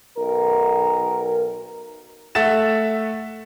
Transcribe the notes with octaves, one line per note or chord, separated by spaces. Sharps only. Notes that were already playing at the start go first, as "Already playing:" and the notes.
B1 A#4
A3 E5 F#5 A6 E7